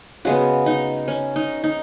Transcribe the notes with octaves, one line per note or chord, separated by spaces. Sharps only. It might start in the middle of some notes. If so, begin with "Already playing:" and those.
C#3 G#3 B3 F#4
D#4
C#4
D#4
D#4